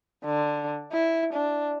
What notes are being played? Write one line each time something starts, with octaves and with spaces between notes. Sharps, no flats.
D3
E4
D4